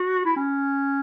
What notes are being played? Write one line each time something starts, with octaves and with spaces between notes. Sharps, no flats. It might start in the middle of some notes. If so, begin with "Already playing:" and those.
Already playing: F#4
E4
C#4